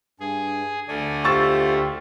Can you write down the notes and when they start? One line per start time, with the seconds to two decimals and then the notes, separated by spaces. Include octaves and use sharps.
0.20 G2 G#4
0.88 D2 A3 D5 G#5
1.24 F4 G4 C5 C#6 E6 A6